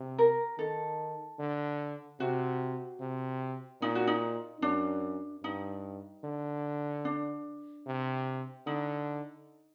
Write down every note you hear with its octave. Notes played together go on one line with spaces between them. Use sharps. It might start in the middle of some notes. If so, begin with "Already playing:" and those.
Already playing: C3
A#4
D#3 A4
D3
C3 F#4
C3
A#2 D#4
F#4
D#4
F#2 D4
G2 D#4
D3
D4
C3
D3 D#4